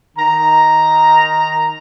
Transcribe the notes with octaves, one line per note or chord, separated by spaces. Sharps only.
D#3 A#5